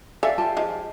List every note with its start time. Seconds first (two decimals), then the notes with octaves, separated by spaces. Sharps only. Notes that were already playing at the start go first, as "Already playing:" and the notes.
0.23 A4 C#5 D5 E5 F5 G#5
0.38 F4 G4 A5
0.57 D#3 F3 G#3